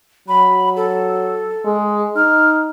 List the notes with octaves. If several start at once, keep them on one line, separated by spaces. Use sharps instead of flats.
F#3 B5
A4
G#3
D#4 F6